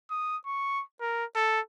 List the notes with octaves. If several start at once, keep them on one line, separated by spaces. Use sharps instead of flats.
D#6
C#6
A#4
A4